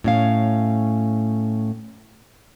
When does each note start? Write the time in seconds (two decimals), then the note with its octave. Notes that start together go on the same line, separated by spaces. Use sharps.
0.04 A2 C#4 F5